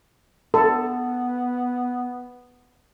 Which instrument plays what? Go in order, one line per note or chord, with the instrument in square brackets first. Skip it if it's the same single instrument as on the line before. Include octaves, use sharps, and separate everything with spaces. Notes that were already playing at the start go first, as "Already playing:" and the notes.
[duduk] B3 [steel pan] A4